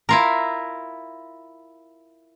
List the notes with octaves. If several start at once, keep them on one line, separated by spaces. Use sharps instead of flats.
E4 F4 A#4